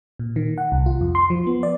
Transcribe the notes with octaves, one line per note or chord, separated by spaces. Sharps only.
A#2
D#3
F#5
C2
F4
F2
C6
F3
B3
D5